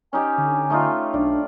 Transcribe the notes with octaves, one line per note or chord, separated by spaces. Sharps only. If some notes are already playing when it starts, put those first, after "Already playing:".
C#4 D#4 G4 G#5
D3
A3 D#4 F4
B1 D4 D5